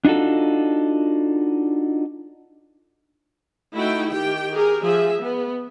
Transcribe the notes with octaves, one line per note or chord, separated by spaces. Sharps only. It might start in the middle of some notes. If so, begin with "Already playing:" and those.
D4 D#4 F4 F#4 A4
A3 D#4 E4 F#4 G5
D#3 G4 G5
G4 G#4 A#4
F3 G#4 E5
B3